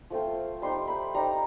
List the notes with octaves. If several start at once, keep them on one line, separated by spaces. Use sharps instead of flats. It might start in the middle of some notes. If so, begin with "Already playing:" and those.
F3 A3 C4 F4
G3 C4 D#4 C6
B5
G3 C4 D#4 A#5